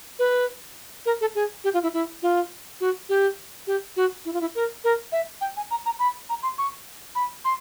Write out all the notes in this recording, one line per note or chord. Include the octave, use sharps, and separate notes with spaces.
B4
A#4
A4
G#4
G4
F4
E4
E4
F4
F#4
G4
G4
F#4
E4
F4
E4
A#4
A#4
E5
G5
G#5
A#5
A#5
B5
A#5
C6
C#6
B5
C6